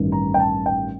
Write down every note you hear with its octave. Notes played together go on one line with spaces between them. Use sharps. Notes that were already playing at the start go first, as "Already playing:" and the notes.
Already playing: A1 G2 D#3
A#5
G5
A5
G5